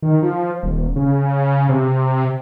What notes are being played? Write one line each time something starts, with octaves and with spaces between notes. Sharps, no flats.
D#3
F3
D#1
C#3
C3